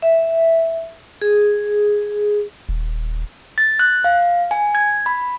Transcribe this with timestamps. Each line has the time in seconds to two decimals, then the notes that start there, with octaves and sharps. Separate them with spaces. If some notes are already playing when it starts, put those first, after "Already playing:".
0.02 E5
1.22 G#4
2.69 D#1
3.58 A6
3.79 F#6
4.04 F5
4.51 G#5
4.75 G#6
5.06 B5